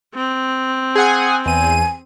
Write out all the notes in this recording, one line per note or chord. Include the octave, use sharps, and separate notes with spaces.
C4
G#4 F#5 G#5
E2 G#5 D#7